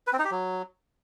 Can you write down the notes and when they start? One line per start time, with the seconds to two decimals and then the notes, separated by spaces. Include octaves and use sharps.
0.07 B4
0.13 C4
0.19 D#4
0.25 G4
0.31 F#3